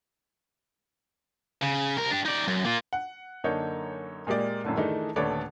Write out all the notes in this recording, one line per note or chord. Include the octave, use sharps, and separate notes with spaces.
C#3
C2 A#4
D4 G4
D#4 D5
F#2
A#3 F4
F#5
F#2 D3 A#3 D#4 C#5 G6
A#2 G#3 A#3 G4 D5
F#2 A2 D3
D#3 E3 A3 D4 D#4 G#4
D#1 D3 A3 B4 C#5 D5